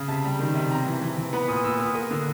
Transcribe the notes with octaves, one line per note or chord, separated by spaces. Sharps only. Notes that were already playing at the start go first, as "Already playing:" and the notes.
Already playing: C#3
C3 A5
G3
D#3
C3
C4 A#5
E3
E3
E3
B3 B5
A#2 D#6
A#2 E6
B3 D#6
A#3 D#6
D3